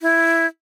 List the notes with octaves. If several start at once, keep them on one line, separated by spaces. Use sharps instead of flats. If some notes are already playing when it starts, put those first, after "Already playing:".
E4